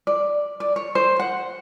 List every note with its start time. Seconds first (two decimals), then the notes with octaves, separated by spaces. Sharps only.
0.07 D5
0.60 D5
0.76 C#5
0.95 C5
1.20 F#5